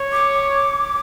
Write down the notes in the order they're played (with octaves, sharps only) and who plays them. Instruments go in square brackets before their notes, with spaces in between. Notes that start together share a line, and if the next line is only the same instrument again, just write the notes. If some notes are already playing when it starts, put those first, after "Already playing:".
Already playing: [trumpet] C#5
[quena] D6